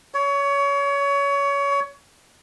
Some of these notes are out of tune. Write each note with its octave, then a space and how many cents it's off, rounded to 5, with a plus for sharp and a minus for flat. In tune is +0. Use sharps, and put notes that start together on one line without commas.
C#5 +25